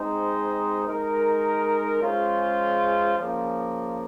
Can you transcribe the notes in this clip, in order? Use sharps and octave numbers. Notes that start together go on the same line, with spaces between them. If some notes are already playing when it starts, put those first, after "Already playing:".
Already playing: G#3 C4 D#4 G#4 C5
G#3 D#4 A#4
G#3 C#4 F4 G#4 C5
C#3 F3 A#3